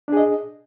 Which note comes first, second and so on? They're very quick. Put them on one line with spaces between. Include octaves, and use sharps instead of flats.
D4 G#4 D#5